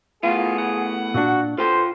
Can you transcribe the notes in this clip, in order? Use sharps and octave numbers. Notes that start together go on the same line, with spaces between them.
A2 B3 F4 G#4
F#5
A#2 D4 F#4
F4 A4 B4 C5 G5